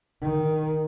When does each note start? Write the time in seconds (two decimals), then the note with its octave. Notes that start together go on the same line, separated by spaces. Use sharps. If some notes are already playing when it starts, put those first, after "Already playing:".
0.21 D#3